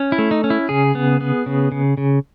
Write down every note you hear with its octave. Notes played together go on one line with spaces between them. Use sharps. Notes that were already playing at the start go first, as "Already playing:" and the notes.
Already playing: C#4
E4
A3
D#4
C#4
E4
C#3 G#4
B3
B3
C#3
C#3
C#3